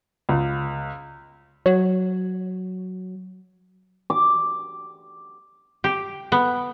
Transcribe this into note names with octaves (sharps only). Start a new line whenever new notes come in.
C#2
F#3 C#5
D6
G4
B3